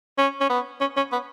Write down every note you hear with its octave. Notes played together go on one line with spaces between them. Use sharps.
C#4
C#4
B3
C#4
C#4
B3